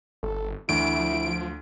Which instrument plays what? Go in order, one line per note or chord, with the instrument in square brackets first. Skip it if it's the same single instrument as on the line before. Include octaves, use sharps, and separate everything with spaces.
[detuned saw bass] G1 [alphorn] A4
[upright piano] D2 [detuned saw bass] E3 [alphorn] E4 [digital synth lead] D7
[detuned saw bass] F3